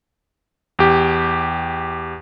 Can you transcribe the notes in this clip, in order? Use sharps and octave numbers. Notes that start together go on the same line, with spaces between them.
E2 G4